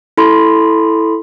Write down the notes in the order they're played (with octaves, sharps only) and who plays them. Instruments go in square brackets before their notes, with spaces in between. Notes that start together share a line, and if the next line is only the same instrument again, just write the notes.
[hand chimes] E4 A4 B5 C6